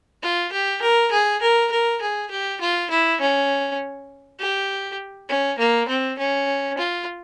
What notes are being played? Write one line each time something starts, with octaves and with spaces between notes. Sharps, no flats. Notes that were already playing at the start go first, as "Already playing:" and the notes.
F4
G4
A#4
G#4
A#4
A#4
G#4
G4
F4
E4
C#4
G4
C#4
A#3
C4
C#4
F4